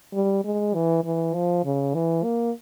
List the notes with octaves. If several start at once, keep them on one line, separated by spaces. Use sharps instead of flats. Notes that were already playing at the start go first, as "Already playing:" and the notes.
G3
G#3
E3
E3
F3
C#3
E3
A#3